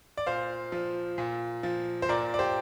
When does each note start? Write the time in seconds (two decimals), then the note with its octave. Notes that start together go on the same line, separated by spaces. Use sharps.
0.17 D5
0.26 A#2 C5 F5
0.72 F3
1.18 A#2
1.63 F3
2.02 C5
2.09 A#2 A#4 D5
2.34 D5
2.39 G4 C5